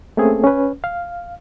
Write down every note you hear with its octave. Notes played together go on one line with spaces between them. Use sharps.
A3 A#3 C4 C#4 G#4 A4
C#4 B4
F5